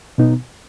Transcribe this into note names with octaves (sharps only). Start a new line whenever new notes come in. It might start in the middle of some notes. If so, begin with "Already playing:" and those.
B2 B3 D#4